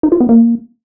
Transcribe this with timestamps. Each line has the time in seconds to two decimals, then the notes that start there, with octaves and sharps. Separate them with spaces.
0.03 D#4
0.12 F4
0.20 B3
0.29 A#3